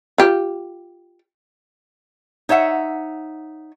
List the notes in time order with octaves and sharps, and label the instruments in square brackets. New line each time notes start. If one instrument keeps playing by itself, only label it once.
[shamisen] F4 G4
[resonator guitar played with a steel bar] D#4 C#5 E5 F#5